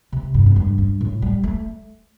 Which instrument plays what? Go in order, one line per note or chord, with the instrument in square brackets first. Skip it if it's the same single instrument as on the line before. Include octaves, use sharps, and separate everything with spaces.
[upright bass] C3
G2
F2
G2
G2
A2
G3
A3